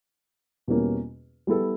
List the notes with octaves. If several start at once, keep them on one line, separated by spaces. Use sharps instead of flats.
E2 B2 G3 A#3 C#4
G3 B3 E4 A4